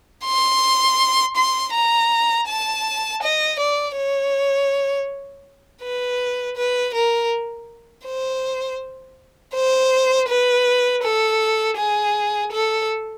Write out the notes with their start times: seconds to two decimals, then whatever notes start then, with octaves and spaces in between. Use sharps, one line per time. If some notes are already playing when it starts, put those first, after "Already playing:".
0.25 C6
1.36 C6
1.74 A#5
2.48 A5
3.22 D#5
3.59 D5
3.97 C#5
5.83 B4
6.57 B4
6.94 A#4
8.05 C5
9.54 C5
10.28 B4
11.03 A4
11.77 G#4
12.52 A4